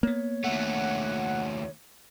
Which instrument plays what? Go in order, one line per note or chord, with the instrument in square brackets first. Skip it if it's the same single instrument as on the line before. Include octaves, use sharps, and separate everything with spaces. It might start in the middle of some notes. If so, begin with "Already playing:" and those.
[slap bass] A#3 B3 [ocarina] C#5
[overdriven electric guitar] D#2 A3 [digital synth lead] F#5